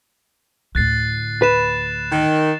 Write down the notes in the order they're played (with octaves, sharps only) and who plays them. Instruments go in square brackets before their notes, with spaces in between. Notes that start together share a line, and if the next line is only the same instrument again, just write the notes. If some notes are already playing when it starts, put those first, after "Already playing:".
[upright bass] D2 A2 [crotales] F#6 A6 C7
[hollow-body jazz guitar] B4 [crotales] F#6 E7
[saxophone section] D#3